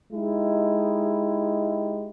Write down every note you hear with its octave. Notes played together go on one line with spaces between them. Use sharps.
G#3 D#4 E4 G4